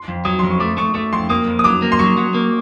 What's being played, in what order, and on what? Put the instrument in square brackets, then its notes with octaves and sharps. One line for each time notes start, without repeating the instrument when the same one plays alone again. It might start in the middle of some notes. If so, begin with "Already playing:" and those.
Already playing: [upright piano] C6
[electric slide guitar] F2
[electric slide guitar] F#3 [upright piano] D#6
[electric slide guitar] F2 [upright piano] C6
[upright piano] C#6
[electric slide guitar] A3 [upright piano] D6
[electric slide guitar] A3 [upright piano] C#6
[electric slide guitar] A3 [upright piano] C#6
[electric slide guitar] F2 [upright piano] C6
[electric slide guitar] A#3 [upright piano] D#6
[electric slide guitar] F2
[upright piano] D#6
[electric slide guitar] F#3 [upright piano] D6
[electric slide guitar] A#3
[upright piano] C6
[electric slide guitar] F#3 [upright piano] C#6
[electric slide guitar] F#3
A#3